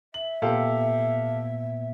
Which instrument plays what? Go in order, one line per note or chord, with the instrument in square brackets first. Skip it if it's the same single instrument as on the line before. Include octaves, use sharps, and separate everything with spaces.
[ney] E5 [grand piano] F#7
[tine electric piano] A#2 B3 [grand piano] G4 A4 F5